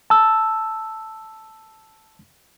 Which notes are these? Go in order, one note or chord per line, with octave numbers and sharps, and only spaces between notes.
A5 E6